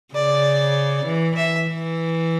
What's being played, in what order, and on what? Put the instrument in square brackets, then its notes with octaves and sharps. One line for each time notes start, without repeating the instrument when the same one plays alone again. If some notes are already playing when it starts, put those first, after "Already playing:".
[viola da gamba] C#3 [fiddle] D5
[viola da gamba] E3
[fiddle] E5
[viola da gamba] E3